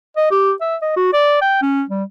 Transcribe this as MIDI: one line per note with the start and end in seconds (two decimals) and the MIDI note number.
0.17 0.26 75
0.31 0.52 67
0.61 0.76 76
0.82 0.94 75
0.97 1.10 66
1.13 1.39 74
1.41 1.60 79
1.62 1.83 61
1.90 2.03 55